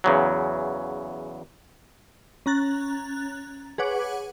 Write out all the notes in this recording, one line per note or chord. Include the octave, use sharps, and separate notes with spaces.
E2 C#3 F#3
C#4 A#5 F#6 A6
G#4 B4 C#5 F#5 D6